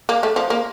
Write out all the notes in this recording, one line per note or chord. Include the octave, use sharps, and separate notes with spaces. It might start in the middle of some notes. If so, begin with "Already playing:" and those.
A#3
A3
F3
A#3